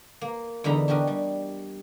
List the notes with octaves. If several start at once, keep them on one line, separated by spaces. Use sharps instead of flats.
A#3
E2 D3 D#4 A#5 B5
D4 F#4 G4 A#4 D#5
G3